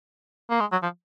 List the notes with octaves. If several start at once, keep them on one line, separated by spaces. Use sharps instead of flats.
A#3
G#3
F#3
F3